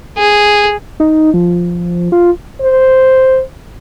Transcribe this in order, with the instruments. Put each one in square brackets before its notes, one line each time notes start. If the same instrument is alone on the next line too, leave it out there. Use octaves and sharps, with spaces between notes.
[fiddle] G#4
[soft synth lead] D#4
F3
F4
[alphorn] C5